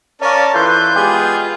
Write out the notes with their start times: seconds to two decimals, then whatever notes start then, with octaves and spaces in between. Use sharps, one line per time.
0.21 C#4 A#4 C#5 D5 F5 A5
0.54 E3 F4 A4 B4 C6 G6
0.96 G#3 B3 F4 G4 G#4